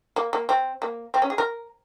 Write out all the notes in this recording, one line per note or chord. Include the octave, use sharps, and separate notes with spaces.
A#3
A#3
C4
A#3
C4
C#4
G#4
A#4